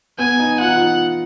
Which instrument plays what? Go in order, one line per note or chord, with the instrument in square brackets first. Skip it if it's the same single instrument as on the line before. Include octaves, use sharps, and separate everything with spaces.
[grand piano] B3 [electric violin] G#5
[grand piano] D#4
[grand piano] F4 [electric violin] F#5
[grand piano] D#4
F4